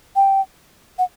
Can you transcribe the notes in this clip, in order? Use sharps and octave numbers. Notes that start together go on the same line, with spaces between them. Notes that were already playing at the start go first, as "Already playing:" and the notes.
G5
F#5